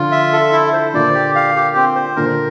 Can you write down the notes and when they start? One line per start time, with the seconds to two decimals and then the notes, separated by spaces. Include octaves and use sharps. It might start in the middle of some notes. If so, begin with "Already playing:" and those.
Already playing: D3 F3 F4
0.12 E5
0.33 A4
0.52 E4
0.73 C5
0.94 A#2 D3 D5
1.15 G4
1.35 F5
1.56 G4
1.76 C4
1.96 C5
2.16 A#2 D3 A#4